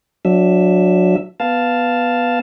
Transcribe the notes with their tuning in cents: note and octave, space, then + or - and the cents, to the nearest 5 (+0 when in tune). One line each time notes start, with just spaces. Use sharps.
F#3 -25 D4 +0 E5 +0
B3 +0 F5 +0 A5 +0